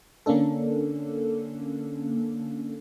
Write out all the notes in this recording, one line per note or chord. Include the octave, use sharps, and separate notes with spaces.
D3 A#3 C#4 D4 A4